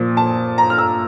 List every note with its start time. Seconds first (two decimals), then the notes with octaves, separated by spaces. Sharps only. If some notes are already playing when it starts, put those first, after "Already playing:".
Already playing: A#2 F3
0.17 A5
0.58 A#5
0.70 F6
0.78 E6